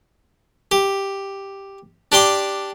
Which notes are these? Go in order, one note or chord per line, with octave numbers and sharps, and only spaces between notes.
G4
D4 G4 G5 C6 D6